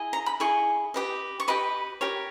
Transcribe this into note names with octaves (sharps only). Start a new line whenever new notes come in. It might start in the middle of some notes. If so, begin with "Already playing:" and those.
Already playing: E4 G#4 D#5
A#5
B5
E4 G#4 D#5 C#6
G4 B4 D#5
C#6
G4 B4 D#5 B5
G4 A#4 C#5